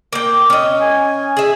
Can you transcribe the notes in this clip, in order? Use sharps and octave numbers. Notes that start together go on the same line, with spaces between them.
A#3 G5
C#4 D#5
G#5
G#4 E5